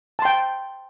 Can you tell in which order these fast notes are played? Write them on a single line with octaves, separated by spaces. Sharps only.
A5 C6 G5